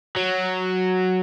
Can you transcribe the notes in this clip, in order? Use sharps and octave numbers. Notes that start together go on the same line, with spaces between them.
F#3